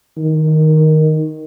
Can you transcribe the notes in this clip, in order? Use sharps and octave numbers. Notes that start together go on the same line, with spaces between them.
D#3